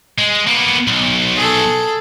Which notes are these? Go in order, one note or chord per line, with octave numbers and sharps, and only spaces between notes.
G#3
A#3 B3
B1
G#4 A4